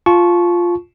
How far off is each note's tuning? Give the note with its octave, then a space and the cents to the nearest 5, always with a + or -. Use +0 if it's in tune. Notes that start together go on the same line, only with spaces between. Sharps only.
F4 +0 A5 -25 C#6 -5